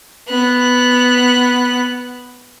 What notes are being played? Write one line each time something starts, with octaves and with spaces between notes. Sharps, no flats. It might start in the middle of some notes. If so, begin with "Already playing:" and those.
B3 F#6